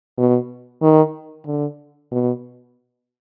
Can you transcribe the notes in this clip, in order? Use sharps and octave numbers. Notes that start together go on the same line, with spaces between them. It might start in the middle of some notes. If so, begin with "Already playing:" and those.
B2
D#3
D3
B2